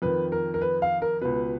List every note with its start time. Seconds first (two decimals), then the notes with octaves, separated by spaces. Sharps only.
0.02 F2 D#3 B4
0.32 A#4
0.54 A#4
0.61 B4
0.82 F5
1.02 A#4
1.21 C#2 B2 B4